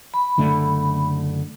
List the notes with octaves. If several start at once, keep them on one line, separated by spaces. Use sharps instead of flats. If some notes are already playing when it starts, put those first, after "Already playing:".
B5
F#1 D3 A3